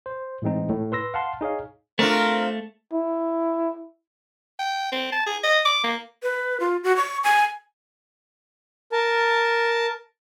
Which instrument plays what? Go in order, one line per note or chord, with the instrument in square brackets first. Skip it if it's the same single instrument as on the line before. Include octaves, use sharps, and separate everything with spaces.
[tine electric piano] C5
A2 E3 G#3 C4 D#4
A2 A3
B4 C6 E6 A#6
F5 F#5 A5 C6
D#4 G#4 C#5 F5
[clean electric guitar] A3 [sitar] C4 D4 F4 [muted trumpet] A#4
[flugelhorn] E4
[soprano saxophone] G5
C4
A5
G#4
D#5
D6
A#3
[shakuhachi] B4
F4
F#4
C#6
G#5
[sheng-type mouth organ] A#4 A5